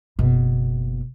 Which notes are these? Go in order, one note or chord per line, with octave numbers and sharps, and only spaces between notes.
F#1 B2